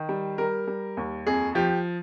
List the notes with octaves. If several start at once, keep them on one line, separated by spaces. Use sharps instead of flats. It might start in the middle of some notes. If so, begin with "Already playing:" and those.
Already playing: D#3
G3
G3 A#4
G3
D#2
F2 G#4
F3 G4